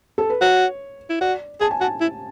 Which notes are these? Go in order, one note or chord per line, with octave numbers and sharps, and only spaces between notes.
A4
B4
F#4 C#5
E4
F#4 D5
G#4 A5
G#5
F#4 A5
E4